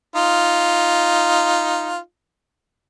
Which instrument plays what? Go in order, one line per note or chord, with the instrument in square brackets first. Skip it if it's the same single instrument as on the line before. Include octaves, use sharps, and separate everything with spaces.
[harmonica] D#4 F4